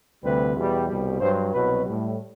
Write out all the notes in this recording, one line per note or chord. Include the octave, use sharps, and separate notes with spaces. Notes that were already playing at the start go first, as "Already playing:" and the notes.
D2 C3 G3 B4
E2 B2 G3
C2 B2 G3
G2 F#3 C5
C2 B2 F#3 B4
A2 G3